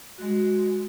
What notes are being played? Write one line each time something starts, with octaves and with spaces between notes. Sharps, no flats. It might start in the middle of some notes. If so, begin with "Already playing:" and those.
G#3 F#4